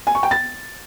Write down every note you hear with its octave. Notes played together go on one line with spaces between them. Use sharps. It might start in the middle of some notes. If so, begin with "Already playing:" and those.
G#5
C#6
G5
A6